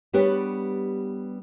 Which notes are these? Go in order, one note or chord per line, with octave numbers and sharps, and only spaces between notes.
G3 B3 D4 G4 B4 C#5